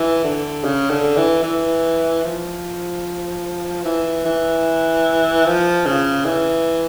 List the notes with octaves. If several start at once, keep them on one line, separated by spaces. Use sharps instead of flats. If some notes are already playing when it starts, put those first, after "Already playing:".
Already playing: E3
D3
C#3
D3
E3
E3
F3
E3
E3
F3
C#3
E3